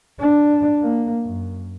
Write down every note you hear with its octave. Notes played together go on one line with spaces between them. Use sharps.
D4
A#3
F#2